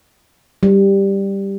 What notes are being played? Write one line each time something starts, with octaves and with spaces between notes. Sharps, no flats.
G3